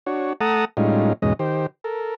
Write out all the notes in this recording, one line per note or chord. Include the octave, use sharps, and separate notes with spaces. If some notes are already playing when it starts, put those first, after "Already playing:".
D4 F#4 C#5
A3 A4 F#5 A5 A#5 D#6
A2 G3 G#3 C#4 D#4 F4
E2 G#2 B2 G#3 C#4 D#5
D#3 G4 C5
A4 A#4